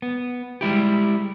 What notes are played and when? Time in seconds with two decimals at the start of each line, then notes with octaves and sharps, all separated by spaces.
0.02 B3
0.61 G3 G#3 E4 G4